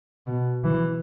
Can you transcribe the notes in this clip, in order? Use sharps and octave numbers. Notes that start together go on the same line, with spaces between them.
B2
E3